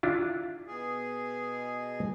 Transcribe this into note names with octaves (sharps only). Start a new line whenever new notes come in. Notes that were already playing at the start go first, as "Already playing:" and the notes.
D4 E4 F4
B2 G#4